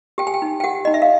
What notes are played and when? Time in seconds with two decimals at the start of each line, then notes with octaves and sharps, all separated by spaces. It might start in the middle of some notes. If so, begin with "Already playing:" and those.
0.18 G4 G5
0.27 G#5
0.34 G5
0.42 D#4
0.60 G5
0.64 G4 F#5
0.85 D#4 D#5
0.94 E5
1.02 F5